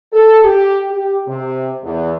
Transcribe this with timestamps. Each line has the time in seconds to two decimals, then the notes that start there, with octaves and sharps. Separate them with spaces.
0.13 A4
0.44 G4
0.91 G4
1.28 C3
1.84 E2